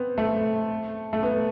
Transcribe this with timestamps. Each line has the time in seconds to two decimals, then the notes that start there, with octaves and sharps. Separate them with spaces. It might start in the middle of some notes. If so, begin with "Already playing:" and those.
Already playing: B3 C4
0.18 A3
1.13 A3
1.22 B3